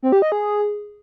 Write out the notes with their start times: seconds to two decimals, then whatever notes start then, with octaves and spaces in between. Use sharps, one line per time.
0.03 C4
0.12 G4
0.22 D#5
0.32 G#4